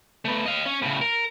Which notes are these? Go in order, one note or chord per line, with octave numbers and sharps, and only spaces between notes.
A3 B3
D#5 F5
C#4
A2 C#3
A#4